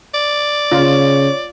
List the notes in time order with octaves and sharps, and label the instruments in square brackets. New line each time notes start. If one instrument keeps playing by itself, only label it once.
[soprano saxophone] D5
[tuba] C#3 [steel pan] F4 [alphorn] C#5